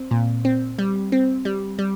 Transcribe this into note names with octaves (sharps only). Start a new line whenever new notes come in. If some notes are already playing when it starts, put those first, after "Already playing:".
Already playing: C4
A#2
C4
G3
C4
G3
G3